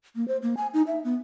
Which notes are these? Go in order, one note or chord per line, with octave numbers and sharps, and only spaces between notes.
A#3
C5
A#3
G#5
D#4
E5
B3